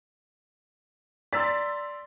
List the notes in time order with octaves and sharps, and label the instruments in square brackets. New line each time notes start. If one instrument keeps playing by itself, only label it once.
[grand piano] D5 A#5 C6 [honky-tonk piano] E6 A6 B6